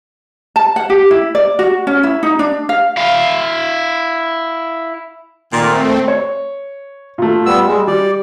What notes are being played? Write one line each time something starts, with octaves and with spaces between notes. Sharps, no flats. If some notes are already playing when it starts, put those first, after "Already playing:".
A5
F#5
G4
E4
D5
F#4
C#4
E4
D#4
D4
F5
E4 F5
A#2 D#3 A3 C4
C#5
A#2 A3
G3 B3 E6
G3 G#3
G3 D5